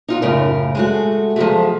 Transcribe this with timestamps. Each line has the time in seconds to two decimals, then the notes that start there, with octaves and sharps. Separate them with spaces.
0.08 D#4 F4 F#4
0.22 F#2 A2 C#3 A#4
0.75 G#3 A3 F#4
1.36 F3 F#3 G#3 A3